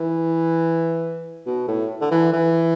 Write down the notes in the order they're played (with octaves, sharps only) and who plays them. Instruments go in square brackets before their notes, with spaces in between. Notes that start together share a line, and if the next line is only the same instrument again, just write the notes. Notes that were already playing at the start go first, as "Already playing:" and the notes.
Already playing: [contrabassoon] E3
B2
A2
D3
E3
E3